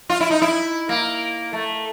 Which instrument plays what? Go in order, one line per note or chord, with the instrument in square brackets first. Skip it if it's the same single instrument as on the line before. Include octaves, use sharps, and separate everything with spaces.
[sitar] F4
E4
D#4
E4
A#3
A3